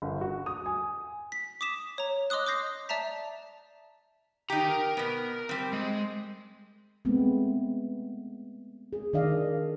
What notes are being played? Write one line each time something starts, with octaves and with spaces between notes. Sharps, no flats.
G1
F#4
D#6
G#5
B6
D6 D#6 B6 E7
C#5 A#5
D#5 C6 D6 D#6 F#6
D6 D#6 G6 A#6 C7
D5 E5 A5 A#5 B6
D#3 D#4 G4 A#5
A#4
B2 B3
G3 C4
G#3
G#3 A3 B3 C4
G#4
D#3 D4 D5 D#5 F5